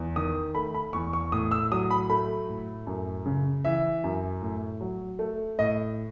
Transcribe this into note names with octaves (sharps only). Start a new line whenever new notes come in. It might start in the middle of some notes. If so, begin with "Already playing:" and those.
Already playing: E2
D#3 D#6
A3 B5
B5
E2 C#6
C#6
A2 D#6
E6
F#3 D#6
B5
A3 B5
A2
F#2
C#3
E3 E5
F#2
A2
F#3
A3
A2 D#5